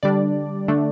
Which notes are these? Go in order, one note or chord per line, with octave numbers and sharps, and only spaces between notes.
D3 G3 D4 D5
D3 A3 D4